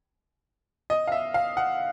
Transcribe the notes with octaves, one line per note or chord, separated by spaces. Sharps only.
D#5
F5
E5
F5
F#5